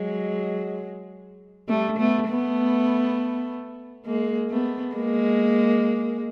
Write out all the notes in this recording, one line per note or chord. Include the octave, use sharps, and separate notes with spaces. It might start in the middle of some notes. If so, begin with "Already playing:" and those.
Already playing: F#3 G#3
G3 A3
A3 B3
A3 B3
G#3 A#3
A3 B3
G#3 A#3